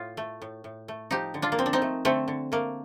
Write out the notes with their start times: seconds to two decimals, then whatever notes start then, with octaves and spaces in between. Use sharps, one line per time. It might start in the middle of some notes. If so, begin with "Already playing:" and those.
Already playing: A2 F4
0.17 A3
0.42 A2
0.64 A2
0.88 A3
1.11 F3 D#4 G4
1.34 D3
1.42 D4 F4
1.52 A#3
1.58 F3 C4
1.66 D4
1.73 C4 D#4
1.82 A3
2.05 D3 A3 C4
2.28 D3
2.52 A3 A#3